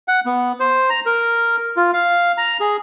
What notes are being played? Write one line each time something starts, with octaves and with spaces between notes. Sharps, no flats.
F#5
B3
C5
A#5
A#4
F4
F5
A#5
G#4